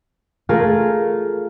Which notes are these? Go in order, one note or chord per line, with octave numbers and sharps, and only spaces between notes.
A3 F4 G#4 A#4